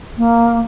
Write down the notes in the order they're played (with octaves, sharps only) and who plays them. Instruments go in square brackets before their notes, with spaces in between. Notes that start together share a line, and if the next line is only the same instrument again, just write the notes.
[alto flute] A#3